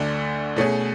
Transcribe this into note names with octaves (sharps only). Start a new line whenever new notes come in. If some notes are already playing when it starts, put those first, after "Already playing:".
Already playing: D2 D3 A3 D4
B2 A3 C#4 G#4